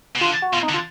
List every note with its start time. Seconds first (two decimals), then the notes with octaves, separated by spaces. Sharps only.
0.16 B2
0.21 D3 F4
0.42 F#4
0.53 B2 F4
0.63 D#4
0.69 D3
0.74 F4